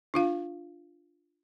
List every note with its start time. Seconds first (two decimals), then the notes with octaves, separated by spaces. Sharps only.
0.14 D4 F4 F5